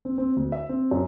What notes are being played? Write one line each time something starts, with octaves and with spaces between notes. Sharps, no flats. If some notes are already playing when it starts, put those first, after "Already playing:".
C4
C4
D2
E5
C4
F#2